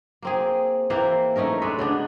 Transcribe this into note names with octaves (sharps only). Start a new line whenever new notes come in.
A#3 C4 G#4
E3 A#3 C4 C5
A3 C#4 D#4 A#4
G#3 D4 A4 B4
C#3 B3 D4